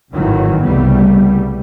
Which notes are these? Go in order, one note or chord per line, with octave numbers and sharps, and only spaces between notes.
G#1 F#2 A2 D#3 E3 F#3
C2 C#3 G3 A3 B3